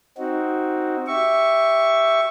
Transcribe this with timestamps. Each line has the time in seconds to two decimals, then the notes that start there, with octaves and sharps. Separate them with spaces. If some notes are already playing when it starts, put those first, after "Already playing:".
0.18 C4 D#4 F#4
1.07 G4 E5 C#6